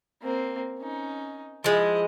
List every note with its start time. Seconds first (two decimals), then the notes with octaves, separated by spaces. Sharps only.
0.22 A#3 C4
0.79 C#4 D#4
1.64 F3 G#3 E4 D#5